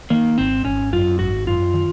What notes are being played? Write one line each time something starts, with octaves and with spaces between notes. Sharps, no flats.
D#3 A#3
G#1 C4
G#1 C#4
F#2 F4
G#1 F#4
F#2 F4
D#3